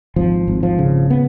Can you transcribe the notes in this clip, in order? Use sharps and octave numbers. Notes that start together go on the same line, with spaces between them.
G#1 F3
G#1
F3
C#3
B3